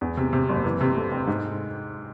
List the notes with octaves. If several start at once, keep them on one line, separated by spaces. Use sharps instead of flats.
E2
C3
C3
F#1
E3
C3
A3
C4
G#2